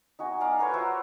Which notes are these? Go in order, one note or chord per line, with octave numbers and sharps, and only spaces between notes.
D#4 F#4 G#5
D5 F5 A#5
F#4 A#4 B4 C#5
F4 F#4 C5 E5